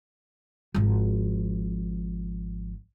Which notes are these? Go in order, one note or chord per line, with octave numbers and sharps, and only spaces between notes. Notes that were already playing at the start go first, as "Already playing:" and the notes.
G#1 F3